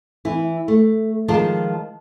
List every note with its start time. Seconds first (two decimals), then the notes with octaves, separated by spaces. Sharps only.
0.25 E3 E4
0.68 A3
1.28 D#3 F3 G#3 F4 G#4 A5